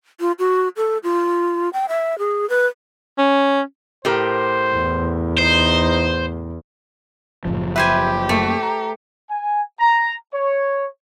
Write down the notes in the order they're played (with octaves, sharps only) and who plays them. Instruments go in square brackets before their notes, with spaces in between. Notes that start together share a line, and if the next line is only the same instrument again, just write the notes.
[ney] F4
F#4
A4
F4
G5
E5
G#4
B4
[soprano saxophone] C#4
[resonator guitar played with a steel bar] A2 G4 A#4 [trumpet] C5
[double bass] E2
[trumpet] D#4 [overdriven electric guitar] C5
[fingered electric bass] F#1 C#2 F3 [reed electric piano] A2
[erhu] G4 [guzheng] B4 C5 G#5 [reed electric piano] E5
[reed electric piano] F#2 A#3 C#6 [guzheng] A3
[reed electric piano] A#5
[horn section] G#5
A#5
C#5